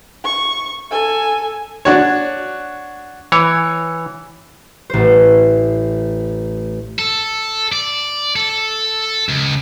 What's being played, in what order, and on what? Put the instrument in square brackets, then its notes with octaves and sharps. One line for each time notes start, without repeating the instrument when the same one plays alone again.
[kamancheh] C#6
A4 G#5
[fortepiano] D4 F#4 C#5
[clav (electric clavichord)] E3 C#5
[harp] A1 C5
[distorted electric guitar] A4
D5
A4
C#2